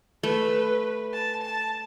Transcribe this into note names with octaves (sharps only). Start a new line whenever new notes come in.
A3 B4
A5
A5